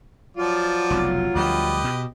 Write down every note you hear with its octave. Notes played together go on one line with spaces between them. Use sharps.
F3 F#3 F4 D5
F1 B1
D2 F3 G3 G4 B4 D#5
B2